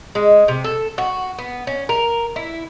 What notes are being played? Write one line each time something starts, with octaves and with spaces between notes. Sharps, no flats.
G#3
C3
A4
F#4
B3
C#4
A#4
E4